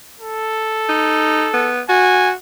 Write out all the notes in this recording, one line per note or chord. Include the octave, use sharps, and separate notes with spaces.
A4
D#4
B3
F#4 G#5